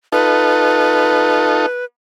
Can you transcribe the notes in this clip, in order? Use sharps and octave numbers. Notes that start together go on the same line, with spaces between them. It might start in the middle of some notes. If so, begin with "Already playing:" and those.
D#4 F4 A4 B4